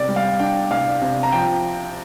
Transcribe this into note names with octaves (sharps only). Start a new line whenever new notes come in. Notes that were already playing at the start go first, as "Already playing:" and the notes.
Already playing: C2 C3 D5
G3
F5
D4 G5
C2 F5
C3
A#5
F3 G5